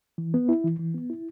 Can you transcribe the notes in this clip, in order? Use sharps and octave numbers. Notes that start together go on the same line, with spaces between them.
E3
B3
E4
E3
E3
B3
E4